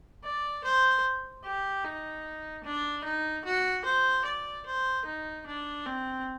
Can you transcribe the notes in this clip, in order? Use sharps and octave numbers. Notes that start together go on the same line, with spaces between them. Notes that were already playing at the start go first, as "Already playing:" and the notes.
D5
C5
G4
D#4
D4
D#4
F#4
C5
D5
C5
D#4
D4
C4